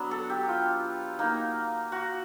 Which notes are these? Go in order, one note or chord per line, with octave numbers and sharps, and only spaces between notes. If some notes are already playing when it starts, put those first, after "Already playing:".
Already playing: F#3 B3 D4
A4
G4
F4
A#3 D#4
F#4